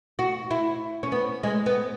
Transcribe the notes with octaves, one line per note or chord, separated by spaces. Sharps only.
F#4
E4
C#4
B3
G#3
B3